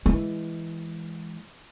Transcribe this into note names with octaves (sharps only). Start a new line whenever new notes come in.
E3 G#3